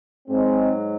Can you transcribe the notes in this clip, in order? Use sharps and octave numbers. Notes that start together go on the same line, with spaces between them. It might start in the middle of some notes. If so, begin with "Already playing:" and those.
G#2 F#3 G#3 C4